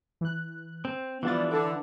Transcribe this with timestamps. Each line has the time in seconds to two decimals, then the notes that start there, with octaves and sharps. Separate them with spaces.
0.21 E3 F#6
0.85 C4
1.23 E3 F3 G3 B3 D4 F4 A6
1.50 D3 A5 D6